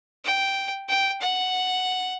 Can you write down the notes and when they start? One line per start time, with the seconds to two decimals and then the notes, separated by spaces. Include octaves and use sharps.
0.24 G5
0.88 G5
1.21 F#5